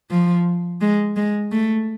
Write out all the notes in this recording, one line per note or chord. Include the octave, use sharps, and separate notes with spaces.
F3
G#3
G#3
A3